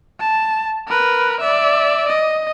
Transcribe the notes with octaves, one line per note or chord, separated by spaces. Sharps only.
A5
A#4 B4
D5 E5
D#5